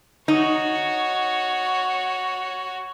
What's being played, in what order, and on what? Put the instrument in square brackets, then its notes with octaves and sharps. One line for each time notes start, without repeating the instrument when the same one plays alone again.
[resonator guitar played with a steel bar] D#4 [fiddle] F#4 C#5